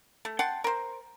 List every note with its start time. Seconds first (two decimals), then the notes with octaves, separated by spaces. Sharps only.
0.25 A3
0.39 F#5 G5 A5 C6
0.64 A#4 C5